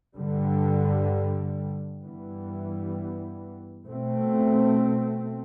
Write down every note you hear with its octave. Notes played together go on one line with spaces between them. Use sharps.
G2 D3 G3
G2 E3 G3 B3
B2 A3 C4